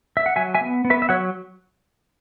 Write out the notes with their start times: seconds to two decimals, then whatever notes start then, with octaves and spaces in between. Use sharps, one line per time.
0.17 E5
0.26 F#5
0.36 F#3 E5 G#5
0.55 E5 G#5
0.61 B3
0.85 B3
0.90 B4 E5
1.02 E5
1.09 F#3 C#5 F#5